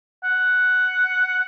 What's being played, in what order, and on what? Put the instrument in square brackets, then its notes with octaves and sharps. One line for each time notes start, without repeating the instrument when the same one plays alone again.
[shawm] F#5